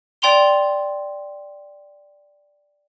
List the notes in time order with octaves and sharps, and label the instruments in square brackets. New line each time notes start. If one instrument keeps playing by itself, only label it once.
[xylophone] D5 G5 C6 F7 G7